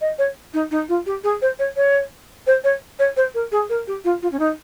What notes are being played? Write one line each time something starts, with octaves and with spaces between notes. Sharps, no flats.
D#5
C#5
D#4
D#4
F4
G4
G#4
C5
C#5
C#5
C5
C#5
C#5
C5
A#4
G#4
A#4
G4
F4
F4
C#4
D#4